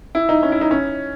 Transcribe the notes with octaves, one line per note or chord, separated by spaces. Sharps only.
E4
D#4
C#4
E4
D#4
C#4